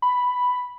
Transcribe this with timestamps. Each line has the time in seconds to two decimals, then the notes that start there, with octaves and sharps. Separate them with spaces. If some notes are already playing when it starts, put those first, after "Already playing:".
0.02 B5